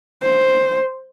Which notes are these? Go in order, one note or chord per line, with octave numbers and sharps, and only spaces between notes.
C5